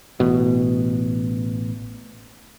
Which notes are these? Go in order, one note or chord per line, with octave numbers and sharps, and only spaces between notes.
A1 B2